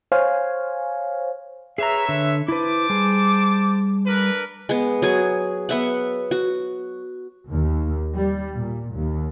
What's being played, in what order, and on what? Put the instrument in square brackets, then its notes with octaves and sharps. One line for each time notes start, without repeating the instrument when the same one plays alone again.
[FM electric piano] C5 C#5 F5 G#5
[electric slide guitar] G#4 A#5 [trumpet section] B4 C#5 E5
[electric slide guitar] D3
[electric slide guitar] E4 B4 [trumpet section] C5 A5 D6
[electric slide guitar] G3 G#4
[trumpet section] D4 A#4 B4
[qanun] G#3 B3
F#3 G#4 G#5
B3 E5 F#5
F#4
[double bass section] D#2
G3
A#2
D#2